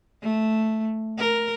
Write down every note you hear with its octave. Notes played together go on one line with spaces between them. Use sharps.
A3
A#4